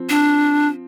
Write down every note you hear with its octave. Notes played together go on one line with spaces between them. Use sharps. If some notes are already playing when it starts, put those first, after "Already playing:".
Already playing: F3 C4
D4